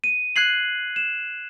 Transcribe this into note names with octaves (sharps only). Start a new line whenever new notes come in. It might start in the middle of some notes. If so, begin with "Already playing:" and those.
D#7
F#6 G#6 C7 F#7
E7